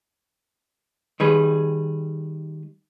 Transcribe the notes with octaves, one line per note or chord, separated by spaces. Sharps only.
D#3 G3 G#4 B4